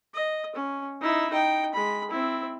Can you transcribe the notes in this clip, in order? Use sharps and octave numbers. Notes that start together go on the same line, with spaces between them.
D#5
C#4
D#4 E4
D#4 G5
G#3 B5
C4 E4